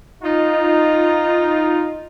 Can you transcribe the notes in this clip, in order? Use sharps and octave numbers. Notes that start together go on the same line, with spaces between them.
D#4 F4